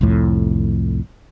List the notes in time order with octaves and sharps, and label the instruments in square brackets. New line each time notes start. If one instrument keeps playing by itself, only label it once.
[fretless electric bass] C2 F2 A2